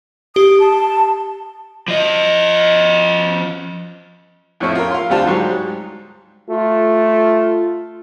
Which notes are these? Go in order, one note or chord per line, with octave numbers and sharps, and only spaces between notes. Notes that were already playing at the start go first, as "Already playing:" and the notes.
G4 D#6
A5
F3 D#5
F2 A2 F3 C#4 E4
F4 A#4
F5 C6
D2 G3 C4 F4 F5 A5
G#2 F#3 G3
A3 F4